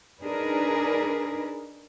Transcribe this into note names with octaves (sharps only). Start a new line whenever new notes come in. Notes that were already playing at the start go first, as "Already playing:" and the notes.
D4 D#4 G#4 A#4 B4